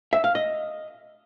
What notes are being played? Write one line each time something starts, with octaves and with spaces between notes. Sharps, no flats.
E5
F5
D#5